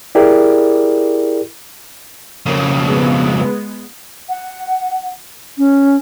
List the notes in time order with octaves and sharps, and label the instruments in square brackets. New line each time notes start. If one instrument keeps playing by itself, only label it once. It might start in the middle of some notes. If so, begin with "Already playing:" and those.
[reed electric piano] E4 G4 G#4 A#4 D5
[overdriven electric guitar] F2 C#3 [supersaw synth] A#3
[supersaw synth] G#3 B3
[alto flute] F#5
C#4